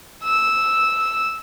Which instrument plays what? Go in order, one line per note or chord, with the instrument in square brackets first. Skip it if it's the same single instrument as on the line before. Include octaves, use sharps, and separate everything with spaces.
[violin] E6